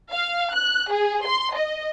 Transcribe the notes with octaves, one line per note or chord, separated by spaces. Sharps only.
F5
F#6
G#4
C6
D#5